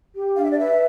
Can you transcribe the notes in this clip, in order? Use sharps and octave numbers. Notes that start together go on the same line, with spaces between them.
G4
D4 F5
E5
D5
B4 E5